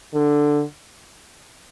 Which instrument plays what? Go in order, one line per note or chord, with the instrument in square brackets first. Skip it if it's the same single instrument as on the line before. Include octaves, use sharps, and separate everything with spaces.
[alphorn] D3